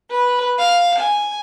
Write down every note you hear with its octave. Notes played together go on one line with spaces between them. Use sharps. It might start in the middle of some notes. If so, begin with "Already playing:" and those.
B4
F5
G#5